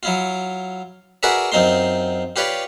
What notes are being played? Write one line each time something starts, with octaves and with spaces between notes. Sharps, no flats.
F#3 E4 F4
F#4 G#4 A#4 B4 D5 E5
F#2 C4 D#4 F4 C6
F4 G4 B4 C#5 D5